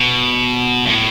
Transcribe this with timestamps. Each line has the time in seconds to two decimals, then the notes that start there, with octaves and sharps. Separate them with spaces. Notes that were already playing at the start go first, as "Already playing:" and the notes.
Already playing: B2
0.85 G2
0.90 A2